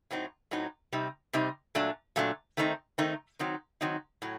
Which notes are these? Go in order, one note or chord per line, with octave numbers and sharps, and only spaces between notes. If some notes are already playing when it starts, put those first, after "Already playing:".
A2 F#3 C4 D#4
A2 F#3 C4 D#4
C3 G3 C4 D#4
C3 G3 C4 D#4
A#2 F#3 A3 D4
A#2 F#3 A3 D4
D#3 A3 C4 D#4
D#3 A3 C4 D#4
D#3 F#3 C4 D#4
D#3 F#3 C4 D#4
A2 F#3